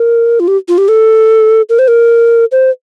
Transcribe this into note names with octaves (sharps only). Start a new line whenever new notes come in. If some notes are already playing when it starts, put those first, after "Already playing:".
Already playing: A#4
F4
G4
F4
G4
A4
A#4
C5
A#4
C5